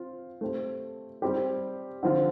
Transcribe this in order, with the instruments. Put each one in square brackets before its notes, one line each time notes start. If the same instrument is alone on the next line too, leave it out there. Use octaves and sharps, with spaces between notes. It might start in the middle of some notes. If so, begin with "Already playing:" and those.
Already playing: [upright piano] C4 F4
A3 C4 G4
G3 C4 G4
D3 F3 C4 F4